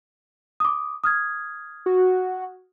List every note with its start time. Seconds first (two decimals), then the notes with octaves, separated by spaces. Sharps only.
0.60 D6 D#6
1.04 D#6 F6 G#6
1.86 F#4